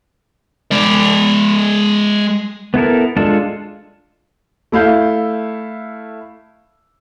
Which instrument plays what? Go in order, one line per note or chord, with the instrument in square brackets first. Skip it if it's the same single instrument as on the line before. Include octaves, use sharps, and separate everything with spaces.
[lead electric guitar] G#3 D5
[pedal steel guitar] B3 E4 A4 A#4
G#3 D4 F4 A4
[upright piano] A3 E4 F5 G6